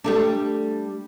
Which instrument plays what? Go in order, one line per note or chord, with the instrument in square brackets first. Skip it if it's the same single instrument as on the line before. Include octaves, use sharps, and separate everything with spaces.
[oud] G3 A3 D4